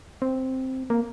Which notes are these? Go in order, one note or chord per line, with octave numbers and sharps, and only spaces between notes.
C4
A#3